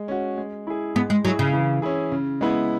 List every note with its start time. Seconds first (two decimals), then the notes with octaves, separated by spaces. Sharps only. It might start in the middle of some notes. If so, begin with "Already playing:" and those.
Already playing: G#3
0.08 C#4 F#4
0.38 G#3
0.67 E4 G#4
0.95 G#3 B3
1.10 G#3
1.25 F#3 E4 G#4
1.39 C#3
1.53 E3
1.82 C#4 E4 G#4
2.12 C#3
2.41 G#3 B3 E4